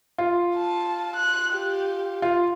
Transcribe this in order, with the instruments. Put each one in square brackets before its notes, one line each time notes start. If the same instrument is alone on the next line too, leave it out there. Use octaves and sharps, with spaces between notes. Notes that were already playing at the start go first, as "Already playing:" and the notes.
[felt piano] F4
[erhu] A5
F#6
G4
[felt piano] F4